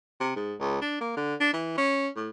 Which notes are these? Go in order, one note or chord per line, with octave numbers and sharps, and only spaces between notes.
C3
G#2
C#2
D4
A#3
D3
D4
E3
C#4
A2